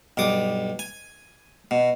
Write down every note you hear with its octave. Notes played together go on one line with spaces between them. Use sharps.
B1 G2 D6 D#6
G#5
B2